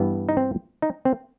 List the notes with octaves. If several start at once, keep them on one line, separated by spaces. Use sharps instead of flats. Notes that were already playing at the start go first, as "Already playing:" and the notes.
Already playing: G2 E3 B3
D#4
C4
D#4
C4